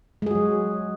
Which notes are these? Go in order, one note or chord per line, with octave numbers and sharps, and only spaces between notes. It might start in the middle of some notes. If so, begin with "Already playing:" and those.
F#3 G#3 F#4 G#4